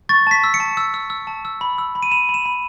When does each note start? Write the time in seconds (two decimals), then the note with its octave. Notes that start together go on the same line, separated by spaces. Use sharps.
0.09 C#6 A6
0.27 A5 B6
0.44 E6
0.54 C#7
0.60 A5
0.77 E6
0.94 E6
1.10 E6
1.27 A5
1.45 E6
1.61 B5
1.78 E6
1.95 B5
2.03 D#7
2.11 B5 E7
2.29 B5
2.34 E7
2.45 B5